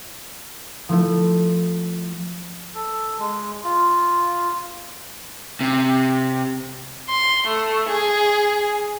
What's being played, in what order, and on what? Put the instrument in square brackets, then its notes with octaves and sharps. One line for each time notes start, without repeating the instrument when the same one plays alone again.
[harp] F3 A3 E4 A4
[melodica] A4
G#3
F4
[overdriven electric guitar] C3
[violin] C6
A3
G#4